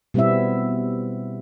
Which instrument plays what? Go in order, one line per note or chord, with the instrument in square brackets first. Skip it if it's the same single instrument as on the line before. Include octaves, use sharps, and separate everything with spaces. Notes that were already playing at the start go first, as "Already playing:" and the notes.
[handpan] B2 G3 B3 C4 E4 E5